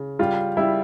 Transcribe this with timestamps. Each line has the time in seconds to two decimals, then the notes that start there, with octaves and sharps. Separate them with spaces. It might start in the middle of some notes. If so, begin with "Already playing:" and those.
Already playing: C#3
0.19 G3 F4
0.57 G3 E4